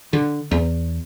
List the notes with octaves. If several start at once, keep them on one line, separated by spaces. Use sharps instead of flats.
D3
E2